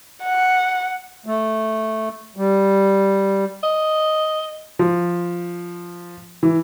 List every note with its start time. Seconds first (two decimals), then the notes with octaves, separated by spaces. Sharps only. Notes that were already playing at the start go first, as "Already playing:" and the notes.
0.23 F#5
1.26 A3
2.37 G3
3.63 D#5
4.79 F3
6.43 E3